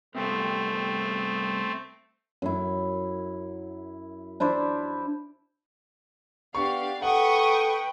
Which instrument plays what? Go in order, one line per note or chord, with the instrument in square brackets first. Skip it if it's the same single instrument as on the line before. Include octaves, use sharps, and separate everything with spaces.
[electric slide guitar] G2 C3 B3 [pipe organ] A3 C4
[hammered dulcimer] F#2 E4
D4 E4 C5 D5
[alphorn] B3 [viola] D4 G4 [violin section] F5 [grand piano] C#6
[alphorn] A4 [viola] B4 G5 [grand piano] F#5 [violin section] C#6 D#6